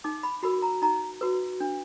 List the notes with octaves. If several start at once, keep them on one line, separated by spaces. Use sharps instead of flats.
D#4 D6
B5
F#4 A#4 B5
A#5
D#4 A#5
F#4 B4
D4